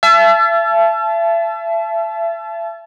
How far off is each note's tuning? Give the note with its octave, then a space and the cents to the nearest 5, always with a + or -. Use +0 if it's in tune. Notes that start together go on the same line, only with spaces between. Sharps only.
E5 +35 A5 -25